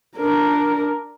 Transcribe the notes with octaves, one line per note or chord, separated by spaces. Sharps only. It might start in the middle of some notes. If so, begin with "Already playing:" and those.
D4 A#4